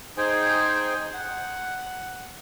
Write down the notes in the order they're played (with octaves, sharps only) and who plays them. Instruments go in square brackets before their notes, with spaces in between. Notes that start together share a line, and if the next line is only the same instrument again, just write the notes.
[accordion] D#4 G#4 C5 G5 G#5
F#5